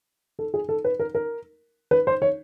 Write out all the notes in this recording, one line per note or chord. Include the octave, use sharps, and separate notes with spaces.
A4
G#4
A4
B4
A#4
A#4
B4
C5
C#5